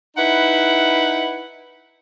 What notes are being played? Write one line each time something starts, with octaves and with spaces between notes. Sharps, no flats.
D#4 E4 B4 F#5